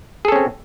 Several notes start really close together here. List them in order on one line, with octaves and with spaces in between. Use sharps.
G#4 A4 C#4 C4